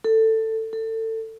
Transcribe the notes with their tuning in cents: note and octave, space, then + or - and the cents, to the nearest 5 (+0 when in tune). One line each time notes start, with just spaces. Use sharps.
A4 +15
A4 +25